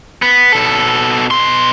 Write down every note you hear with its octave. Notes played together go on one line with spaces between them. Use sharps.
B3
B2 A4
B2 C6